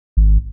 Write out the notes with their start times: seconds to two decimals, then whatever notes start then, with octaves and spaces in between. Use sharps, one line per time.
0.17 G#1